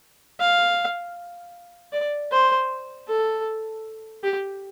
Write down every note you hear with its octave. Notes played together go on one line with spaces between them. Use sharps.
F5
D5
C5
A4
G4